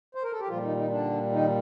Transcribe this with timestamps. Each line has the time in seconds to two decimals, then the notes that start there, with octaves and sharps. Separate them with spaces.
0.15 C5
0.23 A#4
0.32 A4
0.40 G4
0.48 A#2 F3 G3 F4
0.63 D#3 D#4
0.76 D#3 D#4
0.90 D3 D4
1.32 D#3 D#4